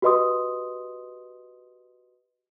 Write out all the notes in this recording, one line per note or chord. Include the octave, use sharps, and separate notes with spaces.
F#4 G4 B4 D#5 C6 D#6